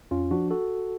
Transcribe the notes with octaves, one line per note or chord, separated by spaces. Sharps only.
F2 C#4 F4
F3 D4 F#4
F#4 A4